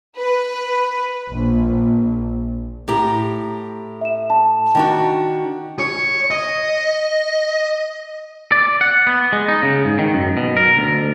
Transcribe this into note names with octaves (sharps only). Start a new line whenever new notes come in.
B4
A#1
A2 G4 A#5
E5 E7
A5
D#3 D4 F#4 G5
C#5
D#5
D5
F#5
B3
G#3
D#4
C#3
G#2
D#3
F#2
B2
A#4
D2